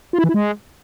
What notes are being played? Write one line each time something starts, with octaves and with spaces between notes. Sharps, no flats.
F4
E4
E3
E4
G#3